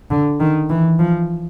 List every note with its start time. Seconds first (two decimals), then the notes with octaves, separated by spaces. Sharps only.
0.10 D3
0.40 D#3
0.69 E3
0.99 F3